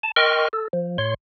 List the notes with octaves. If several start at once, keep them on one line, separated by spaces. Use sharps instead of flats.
A5
A#4 D#5 G5 C6 C#6 F6
A4
F3
A2 C#5 C6